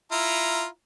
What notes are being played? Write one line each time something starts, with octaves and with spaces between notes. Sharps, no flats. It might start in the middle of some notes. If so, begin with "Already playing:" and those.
E4 F4 A#5